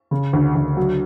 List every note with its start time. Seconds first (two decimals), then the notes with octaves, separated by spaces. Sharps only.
0.11 C#3
0.33 D2
0.55 D2
0.77 F#3